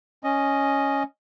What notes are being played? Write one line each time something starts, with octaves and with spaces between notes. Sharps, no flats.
C#4 D#5